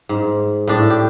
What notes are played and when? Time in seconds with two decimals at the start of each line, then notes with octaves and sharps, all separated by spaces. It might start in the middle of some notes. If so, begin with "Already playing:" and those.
0.09 G#2
0.68 A2 D4
0.90 G4